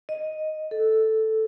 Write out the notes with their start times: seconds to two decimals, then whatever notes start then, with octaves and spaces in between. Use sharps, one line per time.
0.09 D#5
0.71 A4